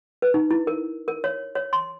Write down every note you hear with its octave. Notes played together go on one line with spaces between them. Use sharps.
B4
D#4
E4
A#4
A#4
C#5
C#5
C6